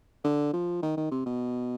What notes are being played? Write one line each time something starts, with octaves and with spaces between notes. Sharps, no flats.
D3
F3
D#3
D#3
C3
B2